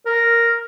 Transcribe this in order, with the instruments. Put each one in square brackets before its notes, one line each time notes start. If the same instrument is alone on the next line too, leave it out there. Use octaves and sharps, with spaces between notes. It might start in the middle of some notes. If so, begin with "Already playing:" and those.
[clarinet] A#4